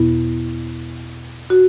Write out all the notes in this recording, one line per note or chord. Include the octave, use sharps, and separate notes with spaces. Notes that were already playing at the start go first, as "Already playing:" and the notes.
Already playing: E2 B2 B3 E4
F#4